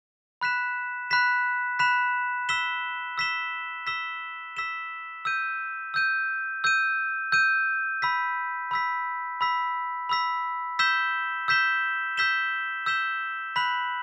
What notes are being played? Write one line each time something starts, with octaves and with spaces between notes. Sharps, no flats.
B5 F#6 B6 E7
B5 F#6 B6 E7
B5 F#6 B6 E7
E6 B6 E7 G7
E6 B6 E7 G7
E6 B6 E7 G7
E6 B6 E7 G7
E6 G6 D#7
E6 G6 D#7
E6 G6 D#7
E6 G6 D#7
B5 E6 B6
B5 E6 B6
B5 E6 B6
B5 E6 B6
E6 G6 B6 E7 G7
E6 G6 B6 E7 G7
E6 G6 B6 E7 G7
E6 G6 B6 E7 G7
B5 F#6 B6 F#7